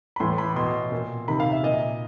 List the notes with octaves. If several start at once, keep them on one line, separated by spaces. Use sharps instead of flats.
B5
A2 E3 C6
B5
B2 C6
A#2
C3 D#3 B5
F5
E5
A#2 D#5